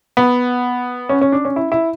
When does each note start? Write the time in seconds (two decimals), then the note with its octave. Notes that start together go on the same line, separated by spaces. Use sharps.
0.17 B3
1.09 C#4
1.21 C#4
1.32 D4
1.45 C#4
1.56 E4
1.72 E4